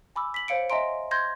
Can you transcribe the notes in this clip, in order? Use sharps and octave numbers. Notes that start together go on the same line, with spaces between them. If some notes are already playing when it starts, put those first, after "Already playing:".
G#5 B5 D6 E6
B6 F#7
C5 C#5 F5 C#7 D7
D#5 E5 G#5 A#5 C6 D7
C6 G6 G#6 A#6